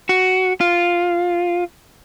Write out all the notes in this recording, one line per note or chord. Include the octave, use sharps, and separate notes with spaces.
F#4
F4